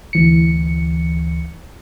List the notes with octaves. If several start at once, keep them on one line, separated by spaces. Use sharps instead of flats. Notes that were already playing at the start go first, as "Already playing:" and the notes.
D2 E3 C#7